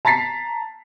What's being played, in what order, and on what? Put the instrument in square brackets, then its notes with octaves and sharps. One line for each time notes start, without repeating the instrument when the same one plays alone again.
[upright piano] A5 A#5 A6 B6 C7